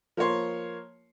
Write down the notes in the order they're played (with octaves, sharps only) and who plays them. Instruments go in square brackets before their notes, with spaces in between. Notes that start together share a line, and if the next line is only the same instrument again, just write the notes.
[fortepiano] F3 A#3 A#4 C#5 C6